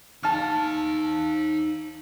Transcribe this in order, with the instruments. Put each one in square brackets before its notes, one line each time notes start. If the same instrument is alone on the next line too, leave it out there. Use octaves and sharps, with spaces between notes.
[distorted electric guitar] D#4 F5 [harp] A5 F6